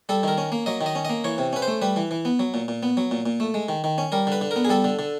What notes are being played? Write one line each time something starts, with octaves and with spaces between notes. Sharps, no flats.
G3 A4
D#3 A#4
C#4
A#3
F#3 D#5
D#3
D#5
C#4
A#3 D#5
E3 C#5
C3
C#4 B4
C5
A3
G3 B4
E3
E3
B3
F#3
A#2
A#2
B3
F#3
A#2
A#2
A3
G#3
D#3
D#3
C#4
G3 A#4
D3 B4
D3
A#4
B3
G#4
G3 A4
D3
D3